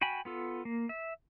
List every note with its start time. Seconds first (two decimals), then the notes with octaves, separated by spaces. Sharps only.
0.01 F#4 G5 G#5 B5
0.25 B3 F4 A4
0.65 A#3
0.89 E5